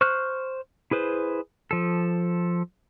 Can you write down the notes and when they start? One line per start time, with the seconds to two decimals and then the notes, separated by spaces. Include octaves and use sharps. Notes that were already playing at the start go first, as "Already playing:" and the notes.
0.01 C5 C#6 F6 F#6
0.91 E4 G#4 B4 C5
1.71 F3 A4